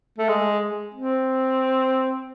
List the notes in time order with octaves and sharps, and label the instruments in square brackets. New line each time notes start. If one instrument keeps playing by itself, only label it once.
[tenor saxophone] A3
G#3
C4